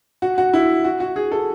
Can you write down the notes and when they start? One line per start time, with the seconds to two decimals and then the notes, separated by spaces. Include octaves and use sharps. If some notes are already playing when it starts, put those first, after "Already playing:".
0.22 F#4
0.38 F#4
0.53 E4
0.84 F#4
1.00 F#4
1.16 G#4
1.32 A4